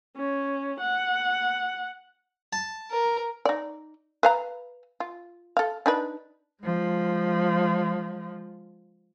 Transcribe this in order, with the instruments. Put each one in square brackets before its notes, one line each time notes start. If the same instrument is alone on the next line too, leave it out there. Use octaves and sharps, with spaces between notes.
[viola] C#4
F#5
[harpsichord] A5
[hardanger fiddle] A#4
[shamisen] D#4 D5
B4 F5 A#5
F4
A4 F5
D4 D#4 B4
[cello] F3 G#3